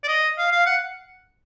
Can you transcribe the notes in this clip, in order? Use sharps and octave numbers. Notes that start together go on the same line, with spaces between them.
D5
D#5
F5
F5
F#5